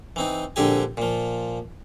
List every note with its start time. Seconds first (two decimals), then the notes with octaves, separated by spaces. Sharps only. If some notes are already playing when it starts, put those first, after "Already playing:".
0.16 E3 C4 D#4
0.56 A#1 D3 C4 G4 G#5
0.97 A#2 F3